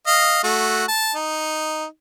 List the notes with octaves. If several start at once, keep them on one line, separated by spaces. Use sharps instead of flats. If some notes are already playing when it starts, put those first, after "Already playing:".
D#5 F5
A3 F#4
A5
D#4